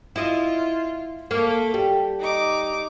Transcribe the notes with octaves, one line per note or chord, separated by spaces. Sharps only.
E4 F4 D#5
A3 A#3 A4
G3
D#4 D6